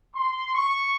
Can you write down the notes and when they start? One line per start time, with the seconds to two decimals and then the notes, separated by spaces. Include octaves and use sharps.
0.14 C6
0.53 C#6